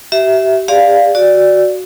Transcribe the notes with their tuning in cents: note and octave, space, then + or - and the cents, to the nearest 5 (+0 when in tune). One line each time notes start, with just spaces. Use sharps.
G4 -35 E5 -5
G4 +45 D5 +0 F5 +0
F#4 +0 D5 +0